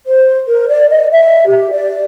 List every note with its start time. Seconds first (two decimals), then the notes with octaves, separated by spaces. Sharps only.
0.07 C5
0.47 A#4
0.68 D5
0.90 D#5
1.11 E5
1.47 G4
1.71 D5